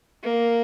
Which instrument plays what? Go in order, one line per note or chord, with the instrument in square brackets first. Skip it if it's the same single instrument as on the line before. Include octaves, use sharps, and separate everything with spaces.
[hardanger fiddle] A#3